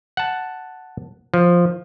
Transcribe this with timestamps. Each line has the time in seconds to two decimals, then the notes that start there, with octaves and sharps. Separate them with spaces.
0.17 F#5 A5
1.34 F3